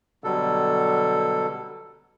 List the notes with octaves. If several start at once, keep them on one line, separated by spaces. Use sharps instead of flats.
B2 D3 F#3 G3 A4